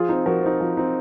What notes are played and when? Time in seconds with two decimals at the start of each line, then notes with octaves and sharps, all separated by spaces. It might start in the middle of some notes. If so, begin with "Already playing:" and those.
Already playing: F3 F4 G#4
0.09 C4 D#4
0.26 F3 F#4 A#4
0.43 C4 D#4
0.61 F3
0.77 C4 D#4